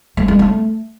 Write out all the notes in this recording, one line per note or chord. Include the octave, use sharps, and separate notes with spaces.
A3
G#3
A3